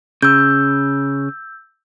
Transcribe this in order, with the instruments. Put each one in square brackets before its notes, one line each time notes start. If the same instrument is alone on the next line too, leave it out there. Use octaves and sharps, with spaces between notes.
[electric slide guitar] C#3 [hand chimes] E6 G6